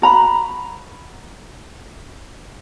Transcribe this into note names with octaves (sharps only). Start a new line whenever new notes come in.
F#4 A#5 B5